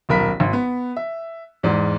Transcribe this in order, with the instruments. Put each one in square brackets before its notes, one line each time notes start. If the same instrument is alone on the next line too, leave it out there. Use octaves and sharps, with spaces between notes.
[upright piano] D#1 B1 A#4 B5 B6
G#1
B3
E5
E2 G#2 D5